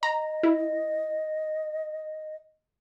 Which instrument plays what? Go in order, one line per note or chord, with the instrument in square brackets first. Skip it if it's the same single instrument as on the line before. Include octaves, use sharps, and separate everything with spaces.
[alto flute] D#5 [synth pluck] A#5
[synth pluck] E4